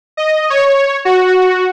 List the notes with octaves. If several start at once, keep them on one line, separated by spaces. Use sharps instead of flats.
D#5
C#5
F#4